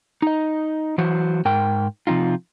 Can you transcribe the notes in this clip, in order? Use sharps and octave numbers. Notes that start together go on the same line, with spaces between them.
D#4 D#5
E3 F#3 F#4 C5
G#2 A#4 G5
C3 F3 C4 D#4 F4